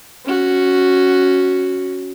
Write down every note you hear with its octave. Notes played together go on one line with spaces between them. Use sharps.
C#4 F#4